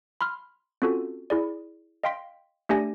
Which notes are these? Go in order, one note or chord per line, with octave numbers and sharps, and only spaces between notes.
B5 C6 F6
C4 C#4 F4 F#4 A4
E4 G#4 D5
D#5 F5 G5 C6 B6
A3 D4 G4 D5 G#5 A#6